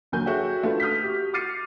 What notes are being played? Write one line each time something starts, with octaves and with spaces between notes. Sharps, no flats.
D#2 D3 F#3 A#4 G#5 G6
F#4 G#4 A4 C#5 E5 G5
A3 D4 F4 A4 B4
D#6 F6 G6 B6
F#4 G4
D6 F6 A6 C7 C#7 D#7